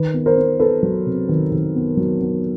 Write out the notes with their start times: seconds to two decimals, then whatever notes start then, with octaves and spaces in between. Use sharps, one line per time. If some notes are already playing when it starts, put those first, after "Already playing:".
Already playing: D#3 B4
0.14 B3
0.26 A#4 C5
0.38 B3
0.60 B3 A4 B4
0.83 F#3
1.06 C3
1.29 D#3
1.52 D#3
1.75 B3
1.97 F#3
2.21 B3